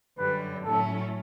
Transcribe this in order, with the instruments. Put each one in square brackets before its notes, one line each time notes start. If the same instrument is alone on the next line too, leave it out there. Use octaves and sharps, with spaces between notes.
[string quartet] F#2 D3 G3 [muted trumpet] B4
[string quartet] A2 F#3 A3 C#4 [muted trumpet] A4